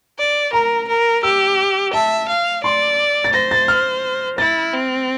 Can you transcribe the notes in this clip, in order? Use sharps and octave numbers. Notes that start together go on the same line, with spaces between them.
D5
A#4 A#5
A#4
G4 E6
E5 A5
F5
D5 C6
A6
C5 A#6
A6
F6
E4 A6
C4